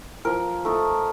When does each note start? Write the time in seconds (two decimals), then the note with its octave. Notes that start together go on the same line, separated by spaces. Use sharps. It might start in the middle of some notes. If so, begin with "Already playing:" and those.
0.25 F3 A#4
0.65 A3 D#4